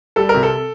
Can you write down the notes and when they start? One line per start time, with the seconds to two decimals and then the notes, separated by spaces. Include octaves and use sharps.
0.16 G3 A4
0.29 A#4
0.34 C3
0.43 A4